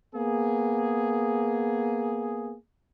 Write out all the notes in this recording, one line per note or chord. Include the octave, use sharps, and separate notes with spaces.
A#3 B3 G#4